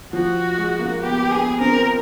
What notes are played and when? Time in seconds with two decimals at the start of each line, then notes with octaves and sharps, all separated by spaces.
0.13 F3 F#4
0.58 G#3
0.79 A#3
1.01 B3 G4
1.31 B3 G#4
1.60 C4 A#4